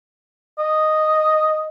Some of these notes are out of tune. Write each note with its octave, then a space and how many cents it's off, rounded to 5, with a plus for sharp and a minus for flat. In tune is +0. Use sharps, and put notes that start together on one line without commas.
D#5 +0